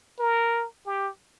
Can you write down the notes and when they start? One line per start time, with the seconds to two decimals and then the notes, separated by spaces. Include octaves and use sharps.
0.19 A#4
0.86 G4